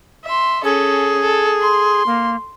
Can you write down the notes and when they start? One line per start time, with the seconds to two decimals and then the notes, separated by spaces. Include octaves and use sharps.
0.25 E5 C6
0.64 C#4 G#4 A4
1.21 A4
1.60 C6
2.06 A#3